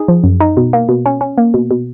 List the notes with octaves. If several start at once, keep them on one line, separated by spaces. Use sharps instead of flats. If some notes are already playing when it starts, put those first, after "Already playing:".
Already playing: D#4 G#4
F3
F#2
D#4
B2
A#3
B2
C#4
C#4
A#3
B2
B2